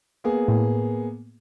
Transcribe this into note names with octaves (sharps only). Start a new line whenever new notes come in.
A#3 B3 G#4
A2